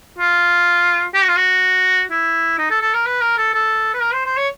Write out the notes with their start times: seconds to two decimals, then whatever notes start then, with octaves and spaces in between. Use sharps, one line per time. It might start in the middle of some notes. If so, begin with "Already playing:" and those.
0.18 F4
1.14 G4
1.22 F#4
1.28 F4
1.36 F#4
2.10 E4
2.58 D#4
2.70 A4
2.81 A4
2.94 A#4
3.06 B4
3.21 A#4
3.37 A4
3.54 A4
3.94 B4
4.02 A#4
4.13 C5
4.26 C5
4.37 C#5